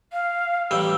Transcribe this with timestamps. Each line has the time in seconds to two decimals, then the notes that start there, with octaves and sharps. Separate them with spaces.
0.13 F5
0.71 A1 G3 G5 E6